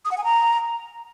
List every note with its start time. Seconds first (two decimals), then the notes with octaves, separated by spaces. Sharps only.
0.05 D#6
0.11 F#5
0.18 G#5
0.24 A#5